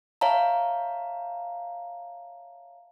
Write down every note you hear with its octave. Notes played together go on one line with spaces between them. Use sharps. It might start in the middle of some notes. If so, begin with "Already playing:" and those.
C#5 E5 F5 A5 A#5